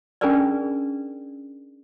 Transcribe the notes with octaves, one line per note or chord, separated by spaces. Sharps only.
C#4 D4 G#4 A#4 B4 D5